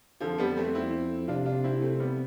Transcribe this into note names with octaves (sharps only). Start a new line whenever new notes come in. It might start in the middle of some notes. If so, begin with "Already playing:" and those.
F2 D3 F3
G3 B3
A3 C4
C4 E4
C3 D4 F4
D4 F4
C4 E4
A3 C4
G3 B3